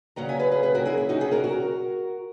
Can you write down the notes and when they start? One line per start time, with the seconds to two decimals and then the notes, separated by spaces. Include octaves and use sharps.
0.16 C#3 F#3 A#3 C#4 F#5 A#5
0.29 E5 G#5
0.39 G#4 B4
0.52 G#4 B4
0.63 G#4 B4
0.75 F#4 A#4
0.86 E4 G#4
0.97 E4
1.09 D#4 F#4
1.21 E4 G#4
1.31 F#4 A#4
1.44 F#4 A#4